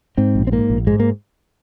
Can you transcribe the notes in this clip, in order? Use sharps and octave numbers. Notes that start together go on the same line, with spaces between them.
G#2 C4
A#1
C4
G#2 A#3
A#1
G#2 G#3
A#3